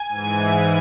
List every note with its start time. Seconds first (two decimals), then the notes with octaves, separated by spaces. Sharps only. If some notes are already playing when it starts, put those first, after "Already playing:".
Already playing: G#5
0.09 G#2 E3